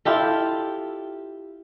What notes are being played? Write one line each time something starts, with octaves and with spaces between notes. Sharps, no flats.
E4 F4 G4 A4